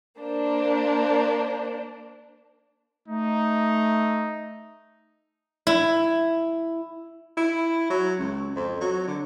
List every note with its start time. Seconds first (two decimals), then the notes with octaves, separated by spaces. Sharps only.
0.19 A#3 D4 C5
3.08 A3 D#4
5.67 E4
7.37 E4
7.90 F#3
8.19 C#2
8.56 F2
8.81 F#3
9.08 D3